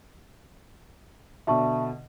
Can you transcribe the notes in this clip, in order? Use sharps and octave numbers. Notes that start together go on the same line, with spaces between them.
B2 D3 D4 E5 A5 C#6